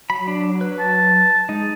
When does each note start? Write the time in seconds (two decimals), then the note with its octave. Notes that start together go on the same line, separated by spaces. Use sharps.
0.10 F#3 B5
0.27 D4
0.61 B4
0.79 A5
1.49 G#3 D#4